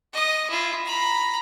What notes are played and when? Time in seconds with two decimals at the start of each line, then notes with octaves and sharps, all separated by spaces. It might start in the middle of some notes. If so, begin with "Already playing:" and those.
0.13 D#5 D#6
0.50 E4 F4
0.85 A#5 B5